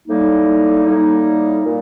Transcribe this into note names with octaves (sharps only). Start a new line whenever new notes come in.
A2 G3 A#3 D#4
A2 G3 A#3 D#4
A#2